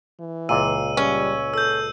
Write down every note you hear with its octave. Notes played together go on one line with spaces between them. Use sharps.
E3
C#2 A#2 E6 D#7
G3 C#4
A4 E6 G6